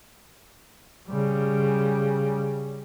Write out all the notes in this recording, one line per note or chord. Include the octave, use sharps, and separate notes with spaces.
C#3 G3